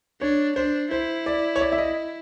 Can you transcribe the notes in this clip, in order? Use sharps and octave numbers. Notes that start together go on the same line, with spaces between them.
D4 C#5
D4 C5
E4 C5
D5
C#5
D5
E5
D#5